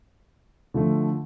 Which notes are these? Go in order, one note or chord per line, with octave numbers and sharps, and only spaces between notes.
D3 F3 A3